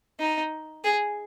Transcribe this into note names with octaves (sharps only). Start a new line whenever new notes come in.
D#4
G#4